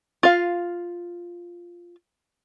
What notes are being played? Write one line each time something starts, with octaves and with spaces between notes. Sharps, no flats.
F4 F5